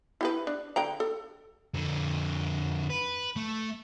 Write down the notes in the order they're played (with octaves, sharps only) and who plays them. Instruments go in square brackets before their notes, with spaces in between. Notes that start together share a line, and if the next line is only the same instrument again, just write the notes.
[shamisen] E4 G4 B4
D4
D3 G5 A#5
A4
[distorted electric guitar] F2 D3
B4
A3